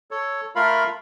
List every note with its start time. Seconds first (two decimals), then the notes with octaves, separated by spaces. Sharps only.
0.11 A4 C#5
0.56 A3 F4 A#4 F5 B5